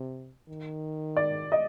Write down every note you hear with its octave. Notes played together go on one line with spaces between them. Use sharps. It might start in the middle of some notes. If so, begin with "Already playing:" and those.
Already playing: C3
D#3
D5
D#5